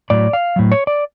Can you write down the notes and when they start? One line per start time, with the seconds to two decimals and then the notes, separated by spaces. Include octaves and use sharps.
0.10 A2 F#3 D5
0.33 F5
0.56 A2 F#3
0.72 C#5
0.87 D5